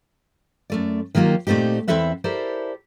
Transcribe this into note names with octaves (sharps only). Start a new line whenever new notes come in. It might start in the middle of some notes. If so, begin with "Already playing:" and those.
F#2 A3 D5
D#3 F#3 A#3 F4 G4
A#2 A3 C4 D#4 G4
E2 C4 E4 A4 E5 F#5
E4 G4 A4 A#4 C5 D5